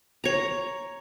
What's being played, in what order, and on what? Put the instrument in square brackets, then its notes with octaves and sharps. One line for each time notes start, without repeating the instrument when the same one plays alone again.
[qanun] C#5 A#5